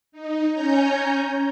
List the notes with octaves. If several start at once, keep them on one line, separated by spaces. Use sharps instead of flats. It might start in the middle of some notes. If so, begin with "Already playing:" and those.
D#4
C#4 C#5 G#5 A#5 G6